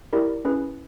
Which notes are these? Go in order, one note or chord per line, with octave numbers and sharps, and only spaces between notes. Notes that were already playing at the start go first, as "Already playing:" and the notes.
E4 G4 A#4 D5
C#4 E4 G#4 B4